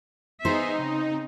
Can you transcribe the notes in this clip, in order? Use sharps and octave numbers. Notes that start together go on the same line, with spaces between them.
B3 D#4 G#4 C5 E5
C#3 C4